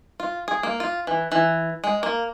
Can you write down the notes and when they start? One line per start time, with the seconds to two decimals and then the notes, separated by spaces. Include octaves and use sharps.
0.20 F4
0.48 G#4
0.63 A#3
0.80 F4
1.07 E3
1.32 E3
1.84 G#3
2.03 A#3